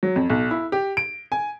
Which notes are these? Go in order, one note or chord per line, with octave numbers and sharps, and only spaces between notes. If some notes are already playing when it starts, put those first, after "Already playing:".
F#3
F2
B1
E4
G4
D7
G#5